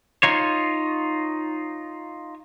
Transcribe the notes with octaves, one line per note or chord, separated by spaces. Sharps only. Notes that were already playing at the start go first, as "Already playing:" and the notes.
D#4 F4 C#5